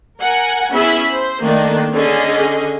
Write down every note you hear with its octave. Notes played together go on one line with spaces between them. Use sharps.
A#4 F#5 G#5
B3 C#4 E4 G#4 E5 B5
C5
D#3 A3 A#3 D4 D#4
D3 C#4 G#4 D#5